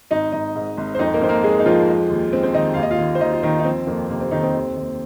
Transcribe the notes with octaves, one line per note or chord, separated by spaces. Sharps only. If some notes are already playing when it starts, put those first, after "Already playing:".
G#1 D#4 D#5
G#1 D#4 D#5
G#2
G#1
C5
F2 D#4 D#5
A#3 A#4
F2 C5
A#3 A#4
G#3 G#4
D#4
F2 F3 F4
G#3
D#2
G#3 C4
C4
D#3 D#4 D#5
D#2 F5
D#5
F4 F5
D#3
C5
D#2 D#4 D#5
F4
D#2 D#3 D#4
D#4
F3 C4
F2 A#3
C3 A#3
C4
F2 D#3 D#4
C4
D#2
D#2